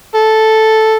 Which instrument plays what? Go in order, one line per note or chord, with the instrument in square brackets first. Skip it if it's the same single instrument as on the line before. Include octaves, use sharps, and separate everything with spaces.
[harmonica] A4